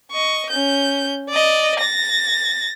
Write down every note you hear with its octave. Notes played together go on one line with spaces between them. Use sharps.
D#5 C#6
C#4 G6
D5 D#5
A6 A#6